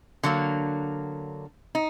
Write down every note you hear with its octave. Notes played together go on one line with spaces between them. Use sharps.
D3 F#3 A#3
D#4